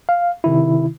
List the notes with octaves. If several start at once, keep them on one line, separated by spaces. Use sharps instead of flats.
F5
C3 D#3 E4